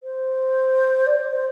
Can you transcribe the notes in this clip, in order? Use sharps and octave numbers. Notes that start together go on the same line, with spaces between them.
C5
D5
C5